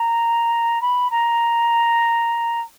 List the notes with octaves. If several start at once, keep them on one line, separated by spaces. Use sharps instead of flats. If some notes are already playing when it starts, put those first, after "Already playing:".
Already playing: A#5
B5
A#5